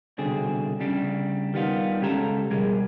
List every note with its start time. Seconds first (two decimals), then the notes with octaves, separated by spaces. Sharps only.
0.18 C2 B2 D3 C4 G#4
0.80 C#3 G3 D4
1.54 D#3 G3 B3 F4
2.01 C#3 G#3 C#4 G4 A4 A#5
2.50 B2 G3 G#4 A#4